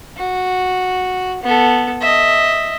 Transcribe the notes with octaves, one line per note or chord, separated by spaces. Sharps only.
F#4
B3 A4
D#5 E5